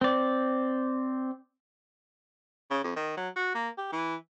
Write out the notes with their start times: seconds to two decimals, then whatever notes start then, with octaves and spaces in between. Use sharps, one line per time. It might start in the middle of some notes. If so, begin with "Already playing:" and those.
0.01 C4 D5
2.71 C#3
2.84 F2
2.96 D#3
3.17 F#3
3.36 F#4
3.54 A#3
3.78 G4
3.92 E3